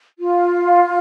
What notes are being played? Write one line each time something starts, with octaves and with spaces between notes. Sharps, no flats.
F4